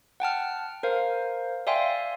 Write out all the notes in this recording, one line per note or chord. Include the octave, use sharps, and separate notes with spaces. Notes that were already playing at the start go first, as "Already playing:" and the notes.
F#5 G5 A5 F6
A#4 C5 F5
D5 E5 F5 G5 G#5 C6